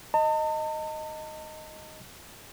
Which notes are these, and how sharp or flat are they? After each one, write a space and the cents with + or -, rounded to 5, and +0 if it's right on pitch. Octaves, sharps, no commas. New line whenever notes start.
D#5 +0 A5 +45